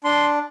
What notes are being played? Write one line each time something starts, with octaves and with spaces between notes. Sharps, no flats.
D4 C6